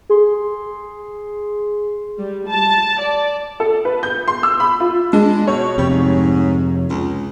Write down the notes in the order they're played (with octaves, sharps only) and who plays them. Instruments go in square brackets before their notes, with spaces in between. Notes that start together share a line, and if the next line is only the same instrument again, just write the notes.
[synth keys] G#4 C6
[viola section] G3
A5
D5
[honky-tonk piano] A4
B4
G6
C6
E6
B5
F4
[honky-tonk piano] G#3 [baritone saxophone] D4
[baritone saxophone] B2 [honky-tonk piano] C#5
[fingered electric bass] F2 C3 [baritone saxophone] G3
[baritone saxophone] G#2
C#2